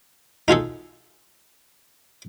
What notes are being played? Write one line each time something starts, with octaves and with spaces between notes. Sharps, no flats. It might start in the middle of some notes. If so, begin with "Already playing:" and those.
D#4 F4 G#4 A4